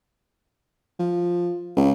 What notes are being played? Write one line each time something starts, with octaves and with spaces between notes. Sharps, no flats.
F3
C#2